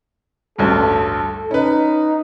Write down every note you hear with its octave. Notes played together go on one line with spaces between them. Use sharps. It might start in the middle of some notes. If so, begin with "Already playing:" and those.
A1 D2 G2 A4
C#4 D#4 B4